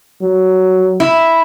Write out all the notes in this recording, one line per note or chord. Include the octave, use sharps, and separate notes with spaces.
F#3
E4